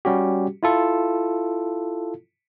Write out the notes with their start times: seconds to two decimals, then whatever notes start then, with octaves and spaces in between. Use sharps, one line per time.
0.05 G3 C#4 F#4 G4
0.63 E4 F4 A4